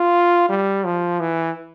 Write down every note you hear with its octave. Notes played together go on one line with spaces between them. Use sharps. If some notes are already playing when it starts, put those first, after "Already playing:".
Already playing: F4
G3
F3
E3